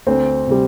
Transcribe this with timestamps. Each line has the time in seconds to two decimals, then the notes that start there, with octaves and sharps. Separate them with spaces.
0.06 D2 C4
0.47 C3 G3